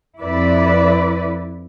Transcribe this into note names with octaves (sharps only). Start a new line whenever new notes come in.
F2 E4 B4 D5